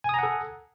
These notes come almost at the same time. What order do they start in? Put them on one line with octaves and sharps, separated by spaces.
G#5 D#6 A#5 F#5 A4